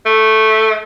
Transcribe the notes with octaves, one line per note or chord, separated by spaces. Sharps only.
A3